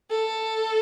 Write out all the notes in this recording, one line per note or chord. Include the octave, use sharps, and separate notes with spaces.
A4